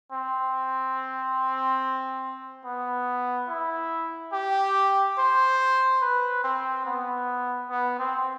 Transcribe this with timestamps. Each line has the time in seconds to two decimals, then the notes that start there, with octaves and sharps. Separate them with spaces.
0.13 C4
2.65 B3
3.49 E4
4.33 G4
5.18 C5
6.02 B4
6.44 C4
6.86 B3
7.70 B3
7.99 C4